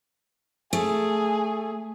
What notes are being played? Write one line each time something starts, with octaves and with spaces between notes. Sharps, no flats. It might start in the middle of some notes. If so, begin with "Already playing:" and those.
A3 G#4